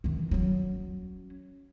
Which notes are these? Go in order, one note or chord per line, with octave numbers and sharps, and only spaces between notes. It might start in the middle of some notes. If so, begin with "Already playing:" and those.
D#3 E3
F#3 C#4